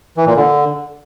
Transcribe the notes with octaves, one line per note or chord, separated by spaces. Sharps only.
E3
A#2
D3